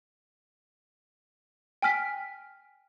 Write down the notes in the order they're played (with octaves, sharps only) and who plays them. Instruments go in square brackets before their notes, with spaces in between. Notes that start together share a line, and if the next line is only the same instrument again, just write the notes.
[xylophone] G5 G#5 F6 B6